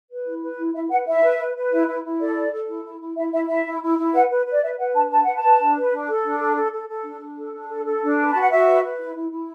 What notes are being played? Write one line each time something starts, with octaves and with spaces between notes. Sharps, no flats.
B4
E4
B4
E4
E4 E5
B4 F#5
E4 E5
B4
B4
B4
E4
E4
E4
A4 D5
A4
A4
E4
E4
E4
E4 E5
E4 E5
E4 E5
E4
E4
E4
B4 F#5
B4
B4
D5
B4 E5
B4 F#5
D4 A5
B4 A5
B4 F#5
A5
B4
D4
B4
D4
A4
D4
A4
A4
A4
A4
D4
D4
A4
D4
A4
A4
D4
B4
F#4 A5
F#5
F#4 E5
B4
B4
E4
E4
E4